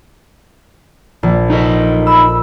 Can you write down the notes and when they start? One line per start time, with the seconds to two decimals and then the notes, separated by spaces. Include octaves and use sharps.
1.23 A#1
1.50 D#4 A4 D#5
2.07 B5 E6